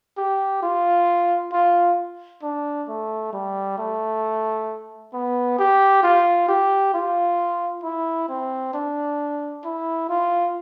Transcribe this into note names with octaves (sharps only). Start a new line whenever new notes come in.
G4
F4
F4
D4
A3
G3
A3
B3
G4
F4
G4
F4
E4
C4
D4
E4
F4